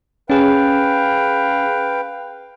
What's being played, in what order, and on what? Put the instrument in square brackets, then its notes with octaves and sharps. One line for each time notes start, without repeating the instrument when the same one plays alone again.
[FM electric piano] C#4 G#4 [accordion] B4 F5 G5